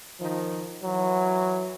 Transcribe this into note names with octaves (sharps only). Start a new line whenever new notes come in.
D#3 F3
E3 F#3